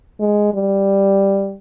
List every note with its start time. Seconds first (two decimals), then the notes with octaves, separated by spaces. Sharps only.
0.20 G#3
0.54 G3